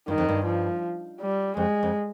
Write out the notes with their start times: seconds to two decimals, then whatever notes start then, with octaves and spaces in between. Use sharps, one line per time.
0.08 G2 D#3
0.18 F2
0.29 G2
0.46 F3
1.20 G3
1.57 F2 G#3
1.83 F2